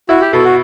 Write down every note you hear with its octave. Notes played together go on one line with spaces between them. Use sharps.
E4 F#4
G4
B2 A4
F#4